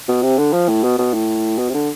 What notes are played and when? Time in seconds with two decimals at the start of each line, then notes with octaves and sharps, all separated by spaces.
0.08 B2
0.23 C3
0.38 D3
0.53 F3
0.68 A2
0.83 B2
0.98 B2
1.14 A2
1.58 B2
1.69 C3
1.74 D3